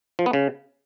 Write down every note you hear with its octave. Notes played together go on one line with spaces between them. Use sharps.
F3
B3
C#3